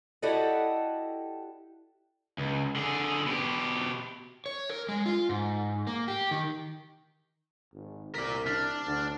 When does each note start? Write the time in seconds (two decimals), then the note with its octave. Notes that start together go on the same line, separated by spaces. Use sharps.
0.22 E4 F#4 G4 A4 D5 D#5
2.38 C#2
2.76 D3 G#4
3.26 B2 G4
4.46 C#5
4.70 A#4
4.89 G#3
5.06 F4
5.29 G#2
5.87 A#3
6.08 G4
6.31 D#3
7.73 G#1
8.15 C2 A#4 D5 B6
8.47 D4 F6
8.86 D2